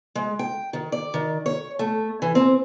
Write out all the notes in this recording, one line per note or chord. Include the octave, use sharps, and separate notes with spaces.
G#3
G5
D#3
D5
D#3
C#5
A3
E3
C4